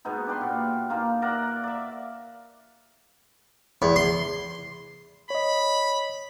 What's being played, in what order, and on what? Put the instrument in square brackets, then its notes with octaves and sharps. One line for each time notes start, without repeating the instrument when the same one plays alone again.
[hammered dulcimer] B2 G#3 B3 D#4
D4 G4 B4 C6
A#2
A#3 D#4 F4
A#4 D5 E5 F#5
D5 E5
[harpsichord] E2
C6
[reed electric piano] C#5 D#5 [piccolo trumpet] B5